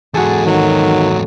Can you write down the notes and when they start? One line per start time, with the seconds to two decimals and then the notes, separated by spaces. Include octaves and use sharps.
0.14 E2 G#2 F#4 G#4 A4
0.46 D#3 F#3